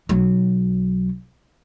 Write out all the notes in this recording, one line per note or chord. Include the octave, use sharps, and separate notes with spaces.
B1 F#3